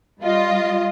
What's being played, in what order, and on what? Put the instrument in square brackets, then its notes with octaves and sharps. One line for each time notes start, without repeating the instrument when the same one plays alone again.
[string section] G3 F4 D#5